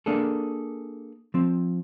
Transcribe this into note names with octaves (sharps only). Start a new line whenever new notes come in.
A#3 D4 G#4 A4
F3 C4